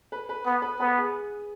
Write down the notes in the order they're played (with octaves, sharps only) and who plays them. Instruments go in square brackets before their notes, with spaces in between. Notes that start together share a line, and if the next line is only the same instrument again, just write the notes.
[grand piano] B4
B4
[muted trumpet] B3
[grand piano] B4
[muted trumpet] B3 [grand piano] B4
[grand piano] G#4